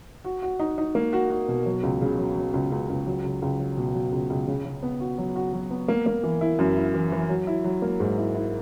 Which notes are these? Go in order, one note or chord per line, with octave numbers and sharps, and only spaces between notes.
F#4
F#4
D#4
D#4
A#3
F#4
F#4
B2
F#3
C#2
C#3
F#3
F#3
C#2
C#2
C#2
F#3
C#2
C#2
F#3
B2
F#3
C#2
C#2
C#3
C#3
B3
F#4
F#3
F#4
F#3
B3
A#3
A#3
E3
E4
F#2
E4
E3
E3
F#3
E4
F#3
A#3
G#2
E4
E4